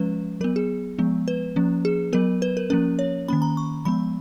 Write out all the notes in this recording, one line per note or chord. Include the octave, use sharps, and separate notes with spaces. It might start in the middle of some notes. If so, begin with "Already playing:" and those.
Already playing: F3 G#3 C#4 B4
F#3 B3 A#4
G#4
F3 G#3 B3
B4
F3 A#3 C#4
G#4
F#3 B3 A#4
B4
A#4
F3 A#3 C#4 A#4
C#5
D#3 A#3 C#4 B5
A#5
C#6
F3 G#3 B3 B5